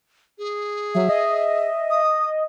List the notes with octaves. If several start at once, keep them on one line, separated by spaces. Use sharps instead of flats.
G#4
F#3 E5
D#5
D#6